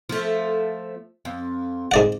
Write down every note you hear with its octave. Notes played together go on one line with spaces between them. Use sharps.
F3 A3
F2
G#2 D5 F#5